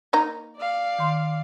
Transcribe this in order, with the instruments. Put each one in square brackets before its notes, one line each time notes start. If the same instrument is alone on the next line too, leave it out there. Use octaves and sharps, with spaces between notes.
[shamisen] A#3 D#4 A#5
[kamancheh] D5 F5
[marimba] D#3 C6